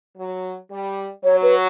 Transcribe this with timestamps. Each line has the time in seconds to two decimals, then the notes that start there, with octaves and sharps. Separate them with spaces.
0.17 F#3
0.71 G3
1.24 F#3 C#5
1.43 B4